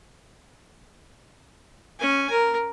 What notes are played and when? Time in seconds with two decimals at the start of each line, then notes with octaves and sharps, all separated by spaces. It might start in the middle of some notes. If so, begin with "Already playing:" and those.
1.99 C#4 G#5
2.30 A#4